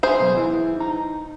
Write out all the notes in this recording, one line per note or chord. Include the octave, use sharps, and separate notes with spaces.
G#4 C5 E5 G#5 C6
B2 F#3
E3 E4
D#4 A#5